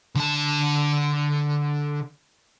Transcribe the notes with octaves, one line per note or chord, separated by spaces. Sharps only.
D3 A5